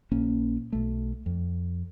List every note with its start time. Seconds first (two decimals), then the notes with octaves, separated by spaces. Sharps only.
0.11 A#1 A#3 C#4
0.73 B1 A3
1.26 F2